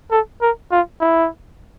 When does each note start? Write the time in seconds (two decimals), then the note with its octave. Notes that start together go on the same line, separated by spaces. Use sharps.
0.11 A4
0.42 A#4
0.71 F4
1.01 E4